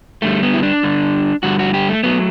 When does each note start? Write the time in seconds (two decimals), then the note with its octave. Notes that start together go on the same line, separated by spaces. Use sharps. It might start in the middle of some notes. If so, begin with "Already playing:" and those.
0.22 G2 D3 G3 A3
0.43 B3
0.54 E4
0.63 D4
0.83 G2 D3 G3
1.43 G2 D3 G3 F#4
1.59 F#4
1.74 G4
1.89 A3
2.04 F#3 A3 B3